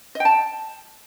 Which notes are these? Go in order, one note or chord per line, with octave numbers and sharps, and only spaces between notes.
D#5 G5 A5